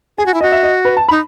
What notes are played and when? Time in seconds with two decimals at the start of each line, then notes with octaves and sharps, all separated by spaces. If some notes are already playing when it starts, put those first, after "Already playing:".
0.18 G#4 G#5
0.26 F#4
0.34 E4
0.41 F#4 D#5
0.52 E5
0.63 D#5
0.85 B4
0.97 A5
1.09 D#4 B5